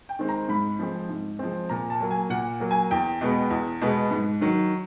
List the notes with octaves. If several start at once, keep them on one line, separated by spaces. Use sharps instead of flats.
G5
D#3 G#3 C4
A#5
G#2 B5
F3 G#3 C4
G#2
F3 G#3 C4
A#2 A#5
A5
F#3 A#3
G#5
A#2 F#5
F#3 A#3
G#5
E2 G5
B2 G#3 B3
E2
B2 G#3 B3
G#2
D#3 F#3